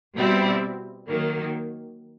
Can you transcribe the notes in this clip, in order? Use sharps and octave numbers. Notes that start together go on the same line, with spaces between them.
B2 G3 C4 E4
D#3 F#3 A#3